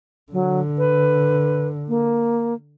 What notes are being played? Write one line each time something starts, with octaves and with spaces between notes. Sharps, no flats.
D3 F#3
B4
A#3